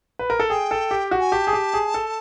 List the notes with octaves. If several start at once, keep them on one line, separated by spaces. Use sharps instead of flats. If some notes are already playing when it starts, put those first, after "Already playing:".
B4
A#4
A4
G#4 G5
A4
G4
F#4
G#5
G4 A5
G#4
G4
G#4
A4